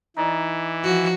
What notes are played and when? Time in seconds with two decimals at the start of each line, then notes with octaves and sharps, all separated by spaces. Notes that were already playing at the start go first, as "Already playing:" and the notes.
0.17 E3 D#4 D5
0.83 F3 F#4